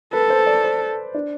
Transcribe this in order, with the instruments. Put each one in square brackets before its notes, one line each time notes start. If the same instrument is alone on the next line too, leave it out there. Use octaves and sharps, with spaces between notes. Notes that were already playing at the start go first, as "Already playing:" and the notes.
[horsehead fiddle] A4 [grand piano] B4
[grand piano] C5
D5
C5
D4